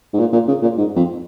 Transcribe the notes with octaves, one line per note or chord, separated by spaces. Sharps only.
G#2
A#2
A#2
C#3
A#2
G#2
F2